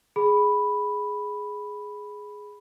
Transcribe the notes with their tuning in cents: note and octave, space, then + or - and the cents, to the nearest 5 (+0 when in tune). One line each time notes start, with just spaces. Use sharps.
G#4 +5 B5 +0